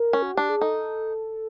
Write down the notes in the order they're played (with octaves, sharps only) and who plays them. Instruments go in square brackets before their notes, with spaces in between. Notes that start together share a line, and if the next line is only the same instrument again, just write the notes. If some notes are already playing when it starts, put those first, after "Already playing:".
Already playing: [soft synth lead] A#4
[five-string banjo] C#4
[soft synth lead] F#4
[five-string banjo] D4 [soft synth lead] G4
[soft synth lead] G#4
[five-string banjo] D#4 [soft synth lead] A4